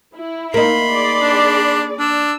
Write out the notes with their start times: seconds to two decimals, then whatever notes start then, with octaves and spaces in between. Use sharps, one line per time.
0.14 E4
0.54 A#3 D#4 B5 C6
0.89 G#4 D5
1.22 D4
1.99 D4 E6